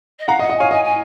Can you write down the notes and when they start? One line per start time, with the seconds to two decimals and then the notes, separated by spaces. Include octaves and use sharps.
0.19 D#5
0.28 F5 F#5 A#5
0.39 D#5
0.42 F#5
0.50 D#5
0.57 C#5 F5 G#5
0.71 D#5 G#5
0.84 G#5